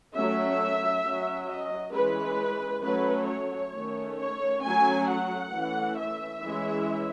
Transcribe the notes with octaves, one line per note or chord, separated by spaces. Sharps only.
F#3 A3 C#4 E5
F#3 C#4
D#5
E3 G#3 C#4 B4
F#3 A3 C#4 B4
C#5
D#3 A3 C#4
C#5
F#3 A3 C#4 G#5
F#5
E3 A3 C#4
E5
E3 G#3 C#4